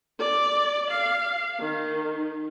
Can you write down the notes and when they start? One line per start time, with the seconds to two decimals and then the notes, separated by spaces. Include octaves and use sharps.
0.19 D5
0.91 F5
1.60 D#3